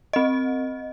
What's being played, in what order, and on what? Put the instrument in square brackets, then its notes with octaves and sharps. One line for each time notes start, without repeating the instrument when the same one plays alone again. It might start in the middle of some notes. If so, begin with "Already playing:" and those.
[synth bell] C4 D#5